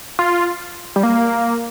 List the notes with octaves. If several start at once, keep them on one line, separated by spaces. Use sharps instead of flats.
F4
G3
A#3